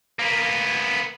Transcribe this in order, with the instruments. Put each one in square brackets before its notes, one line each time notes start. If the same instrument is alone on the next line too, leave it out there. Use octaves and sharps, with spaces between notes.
[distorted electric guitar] A#3 B3